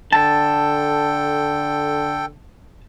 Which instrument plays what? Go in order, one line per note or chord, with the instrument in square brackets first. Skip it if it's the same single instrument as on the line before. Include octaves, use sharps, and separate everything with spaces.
[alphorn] D3 [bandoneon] A4 G5 [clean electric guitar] A5